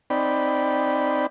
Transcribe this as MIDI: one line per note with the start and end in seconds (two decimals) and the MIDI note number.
0.10 1.26 60
0.10 1.26 63
0.10 1.26 74
0.10 1.26 79
0.10 1.26 83